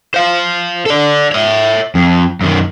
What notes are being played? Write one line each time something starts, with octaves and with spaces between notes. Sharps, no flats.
C5 F5
A4 D5
C#5 E5
F2
F#2 D#3